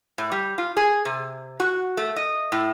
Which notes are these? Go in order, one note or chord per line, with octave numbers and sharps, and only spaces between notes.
A2
G3
F4
G#4
C3
F#4
A3
D#5
A2